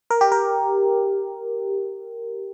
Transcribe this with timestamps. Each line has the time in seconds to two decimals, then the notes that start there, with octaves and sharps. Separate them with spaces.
0.10 A#4
0.21 G4
0.32 A#4